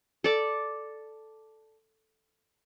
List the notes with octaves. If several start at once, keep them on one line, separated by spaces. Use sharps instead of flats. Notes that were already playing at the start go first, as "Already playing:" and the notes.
A4 D5 D6